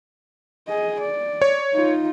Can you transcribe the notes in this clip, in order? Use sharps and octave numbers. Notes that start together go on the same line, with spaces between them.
G#4 D#5
D5
C#5
D#4 F4